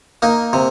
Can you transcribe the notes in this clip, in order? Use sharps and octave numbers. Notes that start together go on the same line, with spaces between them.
A#3 D#4
C3